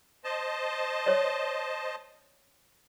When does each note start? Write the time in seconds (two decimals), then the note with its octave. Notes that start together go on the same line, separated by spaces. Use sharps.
0.24 C5 D#5 A5
1.06 C#5 D5